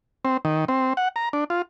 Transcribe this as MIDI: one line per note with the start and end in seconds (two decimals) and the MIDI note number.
0.25 0.37 60
0.45 0.65 51
0.68 0.93 60
0.97 1.08 78
1.16 1.29 82
1.33 1.44 62
1.50 1.62 65